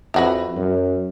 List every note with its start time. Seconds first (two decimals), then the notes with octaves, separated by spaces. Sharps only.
0.14 F2 E4 F#4 B4
0.56 F#2